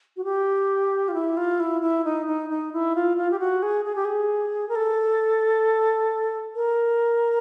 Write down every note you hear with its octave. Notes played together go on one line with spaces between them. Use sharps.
F#4
G4
F4
E4
F4
E4
E4
D#4
D#4
D#4
E4
F4
F4
G4
F#4
G#4
G#4
G4
G#4
A#4
A4
A#4